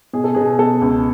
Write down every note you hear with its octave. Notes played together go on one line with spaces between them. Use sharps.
B2 G#4
A4
B2 G#4
B2 A4
C#2